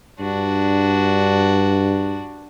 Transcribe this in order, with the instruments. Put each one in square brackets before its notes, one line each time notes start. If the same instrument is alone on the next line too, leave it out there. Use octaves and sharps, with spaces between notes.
[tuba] G2 [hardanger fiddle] D4 F#4